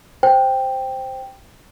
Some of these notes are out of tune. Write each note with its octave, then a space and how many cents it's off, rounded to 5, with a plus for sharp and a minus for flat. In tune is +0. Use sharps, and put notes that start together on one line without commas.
C5 +0 G5 +0